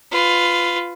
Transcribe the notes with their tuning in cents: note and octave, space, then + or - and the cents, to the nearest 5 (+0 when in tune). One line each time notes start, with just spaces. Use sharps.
F4 +0 B4 +20